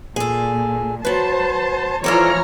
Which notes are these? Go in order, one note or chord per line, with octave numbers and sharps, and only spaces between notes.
A#2 G#4 A4
F#3 B4 C5 A5
E3 F3 F4 A4 C#5 D5 A#5 F6